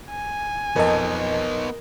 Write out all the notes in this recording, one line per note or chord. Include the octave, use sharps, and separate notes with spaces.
G#5
F2 B3 D#4 A#4 D#5 A5